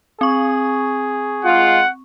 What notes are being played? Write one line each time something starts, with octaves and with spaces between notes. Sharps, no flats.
C4 G#4 C#6
G#3 F4 F#5